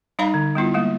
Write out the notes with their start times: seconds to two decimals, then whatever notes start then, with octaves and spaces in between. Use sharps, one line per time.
0.19 G3 D#4 D5 F5 A#5 B5
0.34 D3
0.55 G3 B3 E4 F4
0.74 G3 G#3 A#3